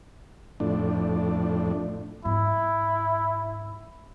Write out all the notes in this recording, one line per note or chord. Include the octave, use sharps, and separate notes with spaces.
F2 A2 D4
G#2 E4